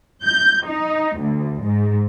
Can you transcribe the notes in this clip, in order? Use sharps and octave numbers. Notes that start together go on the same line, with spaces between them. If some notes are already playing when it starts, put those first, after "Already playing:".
G6
D#4
D2
G#2